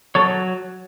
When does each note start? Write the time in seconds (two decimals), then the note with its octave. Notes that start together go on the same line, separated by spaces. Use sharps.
0.15 F#3 A4 C#5